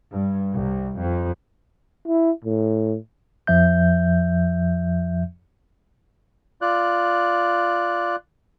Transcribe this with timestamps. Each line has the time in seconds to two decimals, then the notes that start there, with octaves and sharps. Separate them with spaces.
0.11 G2
0.53 C2
1.00 F2
2.08 E4
2.45 A2
3.47 F2 F3 E5 G6
6.62 F4 D5 F#6